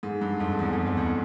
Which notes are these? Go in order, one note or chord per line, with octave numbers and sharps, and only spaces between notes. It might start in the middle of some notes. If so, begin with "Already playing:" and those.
G#2
G2
F2
E2
F2
F2
E2